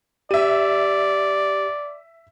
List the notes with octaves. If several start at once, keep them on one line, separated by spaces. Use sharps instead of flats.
G4 D5 E5 D#7